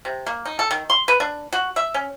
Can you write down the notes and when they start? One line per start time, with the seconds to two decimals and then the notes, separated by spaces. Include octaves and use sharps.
0.05 C3
0.26 A#3
0.45 D#4
0.59 A4
0.71 D#3
0.90 C6
1.08 B4
1.20 D4
1.52 F#4
1.76 E5
1.94 C#4